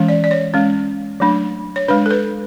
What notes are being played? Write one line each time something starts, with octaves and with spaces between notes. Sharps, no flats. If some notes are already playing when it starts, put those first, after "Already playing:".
Already playing: E3 G#3 C#4
D5
D5
C#5
G#3 C#4
F#3 A3 D4
C#5
G#3 D4 B4
A4
B4